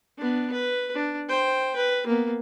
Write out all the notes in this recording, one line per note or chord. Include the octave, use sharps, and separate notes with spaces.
B3 D4
B4
D4
C5 G5
B4
A#3 B3